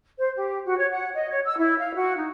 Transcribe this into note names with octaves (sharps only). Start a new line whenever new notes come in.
C5
G4
F#4
C#5
F#5
D#5
C#5
E6
E4
F5
F#4
D#4